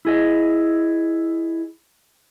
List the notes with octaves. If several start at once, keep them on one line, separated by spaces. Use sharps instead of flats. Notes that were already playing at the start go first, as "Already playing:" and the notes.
E4 G#4 D#5